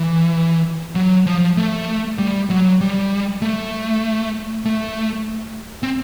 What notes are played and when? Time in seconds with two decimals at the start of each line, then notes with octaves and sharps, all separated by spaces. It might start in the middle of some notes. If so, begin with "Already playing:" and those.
Already playing: E3
0.95 F#3
1.26 F3
1.57 A3
2.18 G3
2.50 F#3
2.81 G3
3.42 A3
4.65 A3
5.83 C4